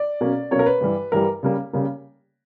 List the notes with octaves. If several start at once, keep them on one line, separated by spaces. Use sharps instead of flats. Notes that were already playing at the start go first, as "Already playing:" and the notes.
Already playing: D5
B2 F#3 A#3 C#4
B2 F#3 A#3 C#4 C#5
A#4
B4
G2 E3 G3
G2 E3 G3 A#4
C#3 G3 A#3
C#3 G3 A#3